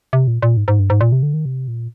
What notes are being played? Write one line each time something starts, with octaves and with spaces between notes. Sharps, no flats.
C3
A#2
A#2
G#2
G#2
G2
G#2
A#2
C3
D3
D#3
C3
A#2